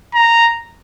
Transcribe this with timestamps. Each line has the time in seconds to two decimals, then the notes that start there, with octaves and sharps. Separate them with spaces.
0.14 A#5